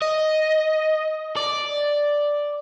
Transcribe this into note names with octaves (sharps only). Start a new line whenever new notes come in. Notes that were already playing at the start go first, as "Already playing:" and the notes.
D#5
D5